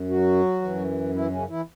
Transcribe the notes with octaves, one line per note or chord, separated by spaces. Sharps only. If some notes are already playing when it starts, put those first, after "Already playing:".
Already playing: F#2
F#3 F#4
F#2 E3
E3 E4
C#3 C#4
E3 E4